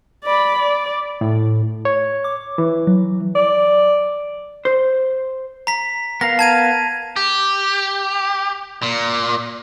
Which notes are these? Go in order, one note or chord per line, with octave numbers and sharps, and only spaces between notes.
D5 B5
D5
A2
C#5
D6
E3
F#3
D5
C5
A#5 B6
B3 A#4 F5 A#6
A5 G#6 D#7
G4
A#2